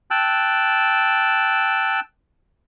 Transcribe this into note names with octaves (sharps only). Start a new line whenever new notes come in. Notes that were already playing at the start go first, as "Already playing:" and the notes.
G5 A5 E6 F#6